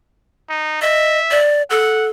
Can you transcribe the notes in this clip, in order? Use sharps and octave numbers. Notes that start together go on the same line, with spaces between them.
D#4
D#5 E5
D5
A4 F#5